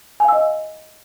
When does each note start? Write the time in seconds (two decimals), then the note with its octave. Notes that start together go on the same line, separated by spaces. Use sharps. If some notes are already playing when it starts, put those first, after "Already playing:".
0.20 G#5
0.24 F5
0.28 E6
0.33 D#5